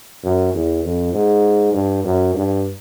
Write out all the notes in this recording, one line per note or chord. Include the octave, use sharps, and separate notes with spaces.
F#2
E2
F2
G#2
G2
F#2
G2